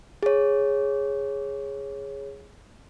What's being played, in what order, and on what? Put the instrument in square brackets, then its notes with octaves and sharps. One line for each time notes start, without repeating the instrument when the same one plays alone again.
[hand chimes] G#4 C#5